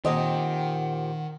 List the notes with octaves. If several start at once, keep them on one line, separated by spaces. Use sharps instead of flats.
A#2 D#3 C4 G4 C5 D#5 F#5